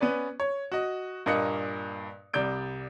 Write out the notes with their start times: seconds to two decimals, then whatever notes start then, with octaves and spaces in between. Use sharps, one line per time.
0.01 B3 C#4 B4 D5
0.40 C#5
0.72 F#4 D#5
1.26 G2 A#2 A#3 D#5 F#6 C#7
2.34 C2 G3 D5 G6 D7